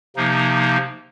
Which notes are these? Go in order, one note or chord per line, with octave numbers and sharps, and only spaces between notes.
C3 F3 A#3 D#4